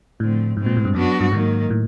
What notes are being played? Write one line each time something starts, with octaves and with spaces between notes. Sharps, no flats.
A2 D3 F3 A3 C4
G#2 B2 G#3 C4
A#2
A2
G2
F#2 F#3 B3 D4 F#4
G2
G#2 D#3 F#3 A#3
A2